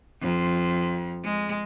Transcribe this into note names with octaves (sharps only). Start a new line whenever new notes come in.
F2
G#3